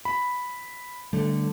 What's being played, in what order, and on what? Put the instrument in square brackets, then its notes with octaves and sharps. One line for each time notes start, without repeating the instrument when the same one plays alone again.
[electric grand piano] B5
[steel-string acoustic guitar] D3 [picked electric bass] G3 A3